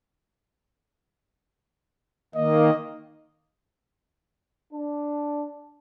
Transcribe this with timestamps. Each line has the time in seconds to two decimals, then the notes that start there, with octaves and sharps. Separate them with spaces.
2.35 D#3 A#3 D#5
4.73 D4